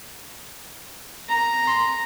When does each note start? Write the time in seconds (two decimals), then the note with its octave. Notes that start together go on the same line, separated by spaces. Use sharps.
1.29 A#5
1.67 C6